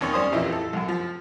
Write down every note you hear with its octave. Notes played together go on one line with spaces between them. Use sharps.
D#2 D#3 C#4 D#4 C#5
G3 C#4 C5 D#6
A#1 F2 E3 E4 G4 D#5
A4
C2 F#2
F3